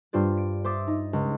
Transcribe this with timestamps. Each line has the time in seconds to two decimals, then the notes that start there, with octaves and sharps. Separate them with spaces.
0.13 G2 F4 C5 D5
0.38 D7
0.64 C5 E5 D6 D#6 A6
0.87 D#4
1.13 C#2